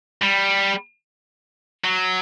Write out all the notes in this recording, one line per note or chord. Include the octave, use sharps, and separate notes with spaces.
G3
F#3